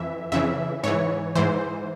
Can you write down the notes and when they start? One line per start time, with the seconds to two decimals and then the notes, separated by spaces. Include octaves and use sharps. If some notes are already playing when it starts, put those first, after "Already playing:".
Already playing: F2 E3 E5
0.32 F2 C#3 E3 E5
0.83 G#2 E3 C#5
1.36 G#2 E3 C5